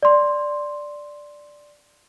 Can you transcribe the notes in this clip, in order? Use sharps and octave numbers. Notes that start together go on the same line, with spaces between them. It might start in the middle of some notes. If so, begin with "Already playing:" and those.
D5 C6